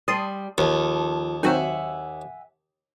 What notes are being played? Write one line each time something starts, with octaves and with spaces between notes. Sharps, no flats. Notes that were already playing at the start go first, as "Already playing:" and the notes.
G3 A5 C6 D#6
D#2 F3 A4
D#3 F#3 C4 E5 F#5 G#5